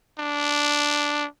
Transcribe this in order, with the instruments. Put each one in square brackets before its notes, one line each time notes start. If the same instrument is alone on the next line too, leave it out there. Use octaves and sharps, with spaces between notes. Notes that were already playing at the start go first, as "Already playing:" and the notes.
[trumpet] D4